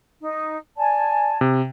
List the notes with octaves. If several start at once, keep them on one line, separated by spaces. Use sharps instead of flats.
D#4
D5 G#5 A5
C3